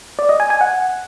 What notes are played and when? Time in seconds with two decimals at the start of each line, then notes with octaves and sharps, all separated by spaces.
0.19 D5
0.29 D#5
0.40 G#5
0.50 G#5
0.61 F#5